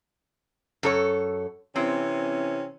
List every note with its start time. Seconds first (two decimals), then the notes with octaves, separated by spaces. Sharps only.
0.83 F#2 A4 C#5
1.76 C3 E3 C4 C#4